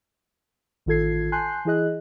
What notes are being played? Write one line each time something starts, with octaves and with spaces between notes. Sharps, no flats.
A1 D#3 F4 A4 G#6 C7
G#5 A5 C6 F#6 G6 C7
E3 E4 G#4 D#5 F#6